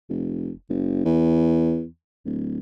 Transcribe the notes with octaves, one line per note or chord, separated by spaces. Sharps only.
F1
F#1
E2
D1